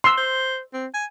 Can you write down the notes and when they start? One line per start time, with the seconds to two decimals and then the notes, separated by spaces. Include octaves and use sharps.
0.04 C6 E6
0.17 C5
0.73 C4
0.94 G#5